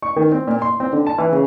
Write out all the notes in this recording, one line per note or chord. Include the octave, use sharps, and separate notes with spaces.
C#6
D#3
C4
A#2
C6
C4
D3
A5
E3
C#3